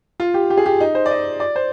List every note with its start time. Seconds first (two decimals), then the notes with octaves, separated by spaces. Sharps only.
0.20 F4
0.34 G4
0.50 G4
0.57 G#4
0.66 G4
0.80 D#4
0.95 C5
1.06 D5
1.11 D#5
1.40 D5
1.56 C5